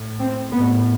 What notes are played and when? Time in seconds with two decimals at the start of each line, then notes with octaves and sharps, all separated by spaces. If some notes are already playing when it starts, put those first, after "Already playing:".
Already playing: A2
0.19 C4
0.51 A2 B3